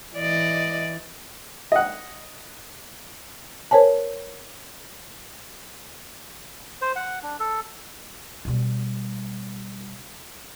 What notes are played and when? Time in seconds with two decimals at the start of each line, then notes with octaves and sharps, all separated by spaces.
0.16 E3 D5 D#5
1.72 D#5 F#5
3.71 A#4 C5 C#5 G#5 A5
6.81 C5
6.96 F#5
7.23 D4
7.40 A4
8.45 B2 G3